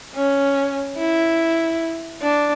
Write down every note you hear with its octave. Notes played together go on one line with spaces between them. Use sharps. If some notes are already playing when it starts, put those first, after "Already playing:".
C#4
E4
D4